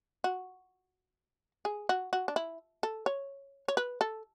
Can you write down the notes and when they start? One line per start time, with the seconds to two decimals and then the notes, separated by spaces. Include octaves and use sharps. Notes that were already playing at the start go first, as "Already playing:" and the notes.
0.24 F#4
1.65 G#4
1.89 F#4
2.13 F#4
2.28 D4
2.36 E4
2.83 A4
3.06 C#5
3.68 C#5
3.77 B4
4.01 A4